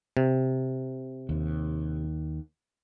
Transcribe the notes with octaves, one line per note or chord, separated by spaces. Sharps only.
C3
D#2